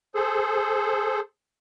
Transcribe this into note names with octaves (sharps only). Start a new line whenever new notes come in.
G#4 A4 C5